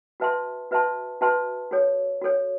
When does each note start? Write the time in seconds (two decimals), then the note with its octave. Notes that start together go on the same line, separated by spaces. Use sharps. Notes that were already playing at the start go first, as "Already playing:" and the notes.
0.20 F#4 B4 E5 A5 C6
0.71 F#4 B4 E5 A5 C6
1.21 F#4 B4 E5 A5 C6
1.71 F#4 A4 C#5
2.22 F#4 A4 C#5